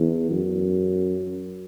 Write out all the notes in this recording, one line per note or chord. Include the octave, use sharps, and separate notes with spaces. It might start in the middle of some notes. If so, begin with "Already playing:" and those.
Already playing: E2
F#2